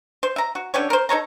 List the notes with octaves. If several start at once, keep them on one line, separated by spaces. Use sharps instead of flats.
C5
E5 A#5
F#4
D3 C#4 G4 C#5
A#4 C5
D#4 A4 C#5 A#5